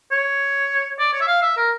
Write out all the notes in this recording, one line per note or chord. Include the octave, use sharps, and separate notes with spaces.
C#5
D5
C#5
E5
F5
E5
A#4